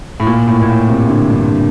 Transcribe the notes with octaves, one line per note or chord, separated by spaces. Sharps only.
A2
A#2
A2
A#2
A2
C3
D3
G2